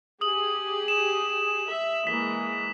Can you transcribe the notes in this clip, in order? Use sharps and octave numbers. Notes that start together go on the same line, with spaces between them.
G4 G#4 D#6 F#7
E7
E5
E3 G#3 A#3 B6